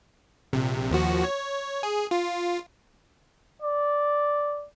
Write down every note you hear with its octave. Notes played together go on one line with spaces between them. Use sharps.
A#1 C3
D#2 F3 F#4
C#5
G#4
F4
D5